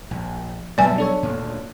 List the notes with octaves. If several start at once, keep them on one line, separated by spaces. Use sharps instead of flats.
A#1
B2 F#3 G3 B4 D5 E5 G#5 A5
D4 A4 C#5
D2 A#2